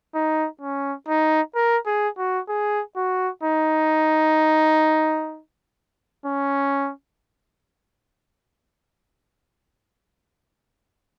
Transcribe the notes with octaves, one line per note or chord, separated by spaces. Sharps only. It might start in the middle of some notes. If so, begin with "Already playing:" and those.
D#4
C#4
D#4
A#4
G#4
F#4
G#4
F#4
D#4
C#4